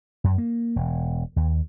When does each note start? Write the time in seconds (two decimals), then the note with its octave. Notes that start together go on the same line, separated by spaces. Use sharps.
0.24 F#2
0.38 A#3
0.76 E1
1.36 D#2